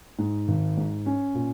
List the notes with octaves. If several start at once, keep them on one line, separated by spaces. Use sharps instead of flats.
G#2
G#1
G#2
C#4
A#2